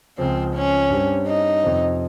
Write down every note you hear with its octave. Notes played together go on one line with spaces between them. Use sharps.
C#2 C#3 F3 C4
C#4
G2 G3 C4
D#4
F2 C3 F3